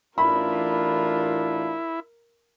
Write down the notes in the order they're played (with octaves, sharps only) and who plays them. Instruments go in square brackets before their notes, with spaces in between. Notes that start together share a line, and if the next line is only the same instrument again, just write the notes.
[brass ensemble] A1 D4 F4 [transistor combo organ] E4 [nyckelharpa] A#4 [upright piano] B5